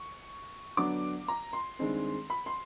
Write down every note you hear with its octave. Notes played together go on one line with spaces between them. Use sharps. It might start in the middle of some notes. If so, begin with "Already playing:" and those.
Already playing: C#6
D3 F#3 B3 D4 D6
A#5
C6
G2 D#3 G#3 C4
B5
C6